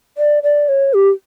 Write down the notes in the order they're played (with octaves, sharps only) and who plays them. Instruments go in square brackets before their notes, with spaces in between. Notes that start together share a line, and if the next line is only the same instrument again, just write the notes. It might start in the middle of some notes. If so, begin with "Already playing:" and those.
[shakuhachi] D5
D5
C#5
G4